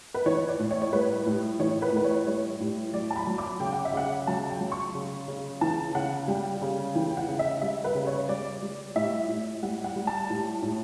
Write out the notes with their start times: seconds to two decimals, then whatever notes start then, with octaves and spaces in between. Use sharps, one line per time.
0.14 B4
0.26 E3 C#5
0.48 D5
0.59 A2
0.71 C#5
0.82 C#5
0.93 G3 B4
1.26 A2
1.60 E3 C#5
1.82 B4
1.93 A2 B4
2.04 C#5
2.26 G3 C#5
2.60 A2
2.94 F#3 D5
3.11 A5
3.16 B5
3.27 F#3
3.38 D6
3.60 C#3 G5
3.73 F#5
3.85 E5
3.94 C#3 F#5
4.27 F#3 A5
4.50 G5
4.61 F#3
4.72 C#6
4.95 C#3
5.28 C#3
5.61 E3 A5
5.94 C#3 F#5
6.28 G3 G5
6.61 C#3
6.95 E3 G5
7.10 G5
7.17 F#5
7.28 C#3
7.39 E5
7.62 G3 E5
7.84 B4
7.95 C#3
8.07 C#5
8.29 G3 D5
8.62 G3
8.96 A2 E5
9.29 A2
9.63 G3 F#5
9.84 F#5
9.96 G3
10.07 A5
10.30 A2
10.62 A2